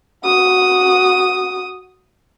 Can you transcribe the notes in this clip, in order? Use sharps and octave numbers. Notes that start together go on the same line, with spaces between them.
F#4 D#6